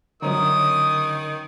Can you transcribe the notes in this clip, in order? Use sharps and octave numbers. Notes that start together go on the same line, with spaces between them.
F#2 D3 D#3 C#4 A#5 D#6